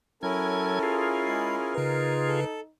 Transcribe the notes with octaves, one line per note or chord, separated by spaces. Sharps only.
F#3 C#4 E4 A4 A#4 G#6
F4 G#4
G#3 B5 C7
C#3 D#4 A#4 B4
A4